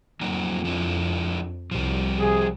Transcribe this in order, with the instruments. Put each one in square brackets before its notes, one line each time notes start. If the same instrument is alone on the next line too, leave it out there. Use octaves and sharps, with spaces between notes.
[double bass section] F2 [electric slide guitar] F#3 A#3 D#4
[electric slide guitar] F3 D4 E4
[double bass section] C2 [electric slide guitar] F3 G3
[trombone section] C3 G#4